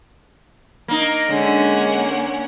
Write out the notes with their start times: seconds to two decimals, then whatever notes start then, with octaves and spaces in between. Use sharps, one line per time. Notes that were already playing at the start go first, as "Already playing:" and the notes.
0.88 A#3 D#4
1.30 D3 G#3 A#3 C#4 F#5